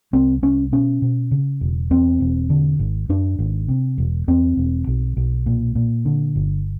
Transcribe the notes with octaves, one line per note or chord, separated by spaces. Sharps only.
C2 C4
C2 C#4
B2 C#4
B2
C#3
E1
E2 C4
E1
D3
G#1
F#2 D4
G#1
C3
E1
E2 C4
E1
B1
B1
A#2
A#2
D3
G1